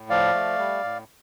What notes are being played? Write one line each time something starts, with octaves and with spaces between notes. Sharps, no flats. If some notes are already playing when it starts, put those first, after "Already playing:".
Already playing: A2
F3 D5 F5
A3
G3
A2